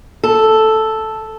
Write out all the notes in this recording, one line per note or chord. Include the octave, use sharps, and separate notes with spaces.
A4